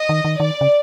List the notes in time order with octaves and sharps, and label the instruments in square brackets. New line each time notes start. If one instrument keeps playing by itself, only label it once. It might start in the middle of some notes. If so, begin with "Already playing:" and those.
Already playing: [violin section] D#5
[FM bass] D#3
D#3
[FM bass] D#3 [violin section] D5
[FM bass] C#3